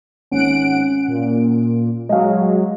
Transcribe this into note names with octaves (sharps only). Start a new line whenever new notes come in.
G#1 C#4 F#5 D7
A#2
F#3 G#3 D#5 F5